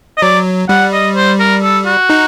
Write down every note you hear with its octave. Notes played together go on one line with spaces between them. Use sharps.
D#5
F#3 D5
G3 F#5
D#5
C5
A#4
A4
F#4
D#4